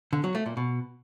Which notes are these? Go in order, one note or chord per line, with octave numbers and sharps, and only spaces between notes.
D3
F#3
A3
A#2
B2